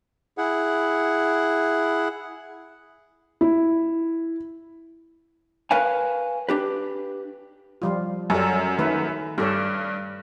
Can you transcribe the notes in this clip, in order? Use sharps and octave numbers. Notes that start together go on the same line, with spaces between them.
E4 G#4 F#5
E4
A#4 B4 C#5 F5 G#5
D4 G4 B4
F3 G3 F4
F#2 G3 C#4 A4
D#3 A3 B4
G2 G4 A4 C#5